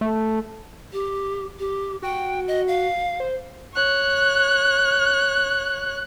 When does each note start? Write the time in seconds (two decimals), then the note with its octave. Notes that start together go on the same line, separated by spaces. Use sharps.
0.01 A3
0.92 G4
1.59 G4
2.02 F#4 G5
2.48 D#5
2.68 F5
3.20 C5
3.74 C#5 F#6